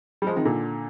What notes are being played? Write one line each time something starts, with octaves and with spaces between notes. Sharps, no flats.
G3
F3 G#3
C3 D#3
A#2 D3